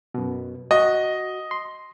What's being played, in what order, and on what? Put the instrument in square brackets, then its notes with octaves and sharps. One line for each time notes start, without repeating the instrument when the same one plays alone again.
[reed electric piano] F#2 B2
[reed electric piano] F#4 [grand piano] D#5
[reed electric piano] C6